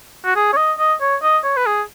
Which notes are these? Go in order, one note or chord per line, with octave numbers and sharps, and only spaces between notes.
F#4
G#4
C#5
D#5
D#5
C#5
D#5
C#5
B4
G#4